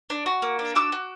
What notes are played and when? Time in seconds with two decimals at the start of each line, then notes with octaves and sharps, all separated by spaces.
0.10 D4
0.26 F#4
0.42 A#3
0.59 D4
0.75 F#4 D6 E6
0.92 F#4